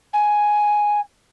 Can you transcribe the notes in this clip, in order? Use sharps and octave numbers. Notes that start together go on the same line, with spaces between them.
G#5